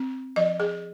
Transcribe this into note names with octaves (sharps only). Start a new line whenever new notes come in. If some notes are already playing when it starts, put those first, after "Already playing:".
Already playing: C4
F3 D#5
G#4